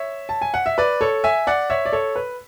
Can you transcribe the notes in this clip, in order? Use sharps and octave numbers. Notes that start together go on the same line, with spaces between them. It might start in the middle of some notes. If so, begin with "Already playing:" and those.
Already playing: C#5 E5
A5
G#5
F#5
E5
B4 D5
A4 C#5
E5 G#5
D5 F#5
C#5 E5
D5
A4 C#5
B4